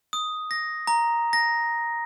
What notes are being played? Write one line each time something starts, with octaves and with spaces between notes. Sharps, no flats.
D#6
A#6
A#5
A#6